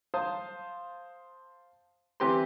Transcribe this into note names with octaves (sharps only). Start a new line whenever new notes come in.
C5 F5 A5 D#6
E3 C4 G4 B4 C6